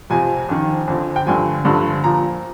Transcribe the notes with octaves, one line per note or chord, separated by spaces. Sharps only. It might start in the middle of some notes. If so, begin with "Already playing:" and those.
F2 C3 F3 G#5
F2 D#3
F2 D3 F3
G5
G2 D3 F3 G#5
G2 D3 F3
A#2 F3 A#5